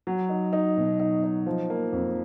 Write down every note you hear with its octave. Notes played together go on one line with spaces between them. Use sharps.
F#3
D#4
D#4
B2
D#4
D#4
F3
A#3
F2